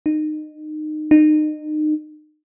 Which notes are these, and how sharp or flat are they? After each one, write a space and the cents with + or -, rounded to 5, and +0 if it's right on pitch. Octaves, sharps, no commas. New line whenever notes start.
D#4 -25
D#4 -30